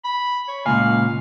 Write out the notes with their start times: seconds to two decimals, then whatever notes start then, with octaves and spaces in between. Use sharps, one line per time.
0.05 B5
0.48 C#5
0.66 C#2 A#2 F5 G#5